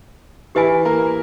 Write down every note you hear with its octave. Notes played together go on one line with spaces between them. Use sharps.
E3 E4 G4 B4 E5 G#5 B5
A#3 A#4